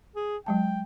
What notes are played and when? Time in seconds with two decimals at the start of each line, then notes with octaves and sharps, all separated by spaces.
0.16 G#4
0.46 F#3 G#3 G5 A5